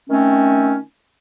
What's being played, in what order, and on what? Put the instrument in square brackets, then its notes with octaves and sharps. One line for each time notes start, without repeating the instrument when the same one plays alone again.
[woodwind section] D#3 A3 C4 C#4